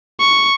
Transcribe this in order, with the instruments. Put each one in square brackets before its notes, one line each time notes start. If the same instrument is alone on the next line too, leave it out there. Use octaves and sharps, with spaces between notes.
[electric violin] C#6